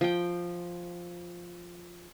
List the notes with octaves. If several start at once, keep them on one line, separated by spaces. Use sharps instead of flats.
F3 G5